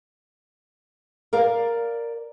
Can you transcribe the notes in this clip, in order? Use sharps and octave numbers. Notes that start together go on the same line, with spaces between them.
A#4 D5 F5